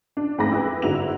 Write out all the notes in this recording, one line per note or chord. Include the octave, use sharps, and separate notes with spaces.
D4
F2 G#2 A3 B5 D6 A#6
E4 G#4 B4
G1 G#2 E4 F#4 F7